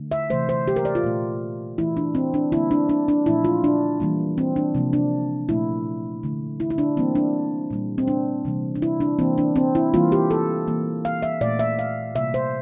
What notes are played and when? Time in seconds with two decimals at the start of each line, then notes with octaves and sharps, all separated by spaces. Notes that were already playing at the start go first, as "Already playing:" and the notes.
Already playing: D3 A3
0.12 E5
0.30 C3 E3 A3 C5
0.49 C5
0.68 G4
0.76 A#4
0.85 D5
0.95 F4
1.04 A#2 A3
1.78 E3 A3 E4
1.97 D4
2.15 C4
2.34 D4
2.52 D3 G3 A#3 E4
2.71 D4
2.89 D4
3.08 D4
3.26 A#2 F3 A3 E4
3.45 F4
3.64 D4
4.00 E3 G3 A#3
4.38 C4
4.56 D4
4.75 C3 F3 A#3
4.93 D4
5.49 A#2 F3 A3 E4
6.23 D3 A3
6.60 E4
6.70 E4
6.78 D4
6.97 E3 G3 A#3 C4
7.15 D4
7.71 A#2 G3 A#3
7.98 C4
8.08 D4
8.45 C3 E3 G3 A#3
8.75 D4
8.82 E4
9.00 D4
9.19 E3 A#3 C4
9.38 D4
9.56 C4
9.75 E4
9.94 E3 G3 A#3 F4
10.12 G4
10.31 A4
10.67 E3 A#3
11.05 F5
11.22 E5
11.41 A#2 A3 D5
11.59 E5
11.79 F5
12.15 C3 G3 A#3 E5
12.34 C5